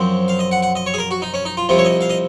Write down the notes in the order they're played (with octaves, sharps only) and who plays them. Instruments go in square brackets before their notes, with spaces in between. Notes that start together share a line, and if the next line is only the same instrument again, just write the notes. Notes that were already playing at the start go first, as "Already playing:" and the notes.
Already playing: [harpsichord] F#2 F3 C4
F5
D#5
F#5
F#5
D#5
C#5
G#4
A#4
F#4
D#4
C#4
D#4
F4
C2 C3 F3 F4
C#5
D#5
F5
D#5